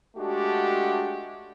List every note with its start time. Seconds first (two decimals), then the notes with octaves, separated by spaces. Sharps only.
0.17 G#3 A3 D4 F#4 G4